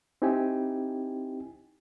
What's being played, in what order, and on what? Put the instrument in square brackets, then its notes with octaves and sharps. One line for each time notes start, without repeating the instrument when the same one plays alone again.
[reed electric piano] C4 D#4 E4 G4 G5 G#5